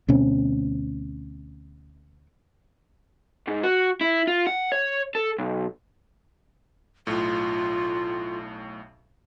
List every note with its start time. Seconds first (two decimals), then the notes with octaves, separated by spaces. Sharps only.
0.08 D2 B2 C4 C#4
3.48 G#2
3.64 F#4
4.01 E4
4.27 F4
4.47 F#5
4.72 C#5
5.15 A4
5.39 B1
7.07 B1 A2 F4